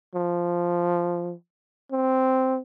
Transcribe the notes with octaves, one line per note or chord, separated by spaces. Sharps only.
F3
C4